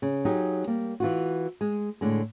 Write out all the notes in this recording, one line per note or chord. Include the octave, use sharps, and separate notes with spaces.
C#3
F#3 D#4 G4 G#4
G3 A#3
E3 F4 F#4
G#3
A2 D3 G#3